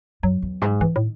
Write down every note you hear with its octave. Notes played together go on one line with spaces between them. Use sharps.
F#2 F#3
E2
G#2
D#3 E3
A2